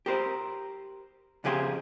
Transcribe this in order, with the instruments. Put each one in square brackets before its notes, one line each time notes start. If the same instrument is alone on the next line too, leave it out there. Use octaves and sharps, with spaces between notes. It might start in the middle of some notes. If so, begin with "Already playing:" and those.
[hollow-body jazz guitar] G4 A#4 C5
F2 C#3 G4 G#4 F5 C6